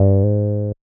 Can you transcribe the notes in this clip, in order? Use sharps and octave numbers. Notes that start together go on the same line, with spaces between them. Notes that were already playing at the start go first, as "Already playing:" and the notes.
Already playing: G2
G#2